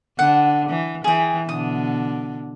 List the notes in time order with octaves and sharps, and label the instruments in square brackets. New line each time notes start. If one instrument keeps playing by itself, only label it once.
[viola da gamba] D3 [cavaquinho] F#5
[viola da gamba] E3
[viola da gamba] E3 [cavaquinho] G#4 G5
[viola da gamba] B2 D3 [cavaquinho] D#6